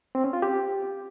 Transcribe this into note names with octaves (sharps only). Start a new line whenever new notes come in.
C4
C#4
F4
G4